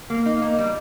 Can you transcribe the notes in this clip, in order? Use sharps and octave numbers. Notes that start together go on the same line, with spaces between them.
A#3
D#4
A#3
G3